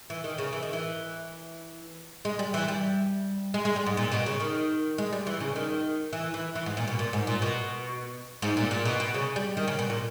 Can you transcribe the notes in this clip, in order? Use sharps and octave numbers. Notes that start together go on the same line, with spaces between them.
E3
D#3
C#3
E3
D#3
E3
G#3
G3
E3
G3
G#3
G#3
G3
G#2
A#2
B2
C#3
D#3
G#3
G3
E3
C#3
D#3
E3
E3
E3
G#2
A#2
B2
A#2
G#2
A#2
B2
G#2
A#2
A#2
B2
B2
C#3
G3
D#3
C#3
B2
A#2